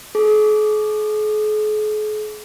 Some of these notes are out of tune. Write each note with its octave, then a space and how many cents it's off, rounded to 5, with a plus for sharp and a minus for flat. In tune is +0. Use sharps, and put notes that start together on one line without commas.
G#4 +45 D6 -30